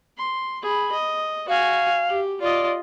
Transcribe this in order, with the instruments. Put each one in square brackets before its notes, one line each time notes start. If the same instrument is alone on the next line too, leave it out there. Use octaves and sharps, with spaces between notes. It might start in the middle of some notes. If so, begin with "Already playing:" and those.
[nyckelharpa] C6
G#4 B5
D#5
[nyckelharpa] F#4 G#5 [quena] F5
[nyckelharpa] G4
[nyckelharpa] F4 D#5 [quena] D5